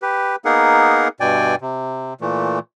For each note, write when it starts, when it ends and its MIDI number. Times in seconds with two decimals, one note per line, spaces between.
0.02 0.36 67
0.02 0.36 71
0.45 1.08 58
0.45 1.08 59
0.45 1.08 63
0.45 1.08 68
0.45 1.08 70
0.45 1.08 78
1.20 1.55 43
1.20 1.55 47
1.20 1.55 74
1.20 1.55 79
1.20 1.55 80
1.61 2.14 48
2.21 2.59 46
2.21 2.59 52
2.21 2.59 57